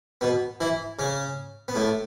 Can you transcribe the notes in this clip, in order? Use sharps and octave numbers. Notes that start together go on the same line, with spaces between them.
B2 B3
E3 E4
C#3 C#4
B3
A2 A3